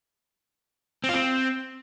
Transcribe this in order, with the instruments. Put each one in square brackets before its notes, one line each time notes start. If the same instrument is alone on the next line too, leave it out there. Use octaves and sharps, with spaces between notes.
[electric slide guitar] C4
F4
C4